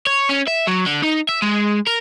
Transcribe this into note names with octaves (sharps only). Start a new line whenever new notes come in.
C#5
C#4
E5
F#3
D3
D#4
E5
G#3
A#4